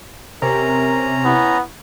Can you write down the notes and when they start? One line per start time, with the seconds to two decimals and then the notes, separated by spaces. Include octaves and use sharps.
0.42 C3 C#4 A#4 A#5
1.25 B3 E4